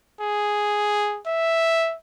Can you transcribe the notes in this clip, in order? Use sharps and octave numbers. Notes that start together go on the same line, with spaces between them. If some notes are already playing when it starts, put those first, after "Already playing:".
G#4
E5